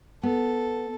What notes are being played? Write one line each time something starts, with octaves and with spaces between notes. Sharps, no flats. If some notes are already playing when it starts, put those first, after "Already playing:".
B3 A4